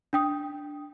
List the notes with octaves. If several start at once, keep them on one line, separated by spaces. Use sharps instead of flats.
D4 G5 D#6